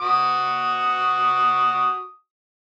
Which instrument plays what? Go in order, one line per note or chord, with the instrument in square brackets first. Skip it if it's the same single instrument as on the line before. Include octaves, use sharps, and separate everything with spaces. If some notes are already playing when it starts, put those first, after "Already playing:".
[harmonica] F#4 C#6 D#6